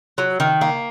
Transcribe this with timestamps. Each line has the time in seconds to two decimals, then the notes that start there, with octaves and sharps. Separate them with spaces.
0.18 F#3
0.40 D#3
0.61 A#3